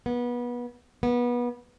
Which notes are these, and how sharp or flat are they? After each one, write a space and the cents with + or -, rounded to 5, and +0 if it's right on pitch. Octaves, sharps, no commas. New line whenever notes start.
B3 -25
B3 -25